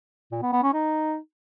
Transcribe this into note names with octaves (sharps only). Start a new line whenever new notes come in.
A#2
B3
B3
C#4
D#4